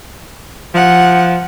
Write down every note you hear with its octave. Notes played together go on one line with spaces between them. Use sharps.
F3 F#5